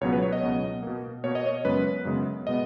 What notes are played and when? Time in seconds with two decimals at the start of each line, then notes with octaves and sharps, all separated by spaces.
0.01 C#2 B2 F#3 B3 C#5
0.12 B4
0.22 C#5
0.33 D#5
0.43 C#2 B2 F#3 B3
0.83 B2 A#3
1.24 B2 A#3 C#5
1.35 D#5
1.47 C#5
1.64 F#2 C#3 G#3 B3 B4
2.05 F#2 C#3 G#3 B3
2.47 B2 G#3 B3 D#5